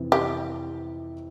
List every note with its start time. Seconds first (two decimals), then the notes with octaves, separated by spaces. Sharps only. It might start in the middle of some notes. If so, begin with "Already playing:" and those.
Already playing: F2 C3 E3
0.12 G4